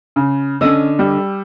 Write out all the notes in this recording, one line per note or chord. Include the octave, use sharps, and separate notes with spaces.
C#3
D3 C#4 D#5 E6
G3 G4